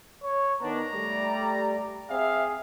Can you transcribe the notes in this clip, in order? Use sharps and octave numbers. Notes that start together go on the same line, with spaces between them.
C#5
D#3 B3 D4 A#5
G3 A3 D5
C4 G#4 E5 F5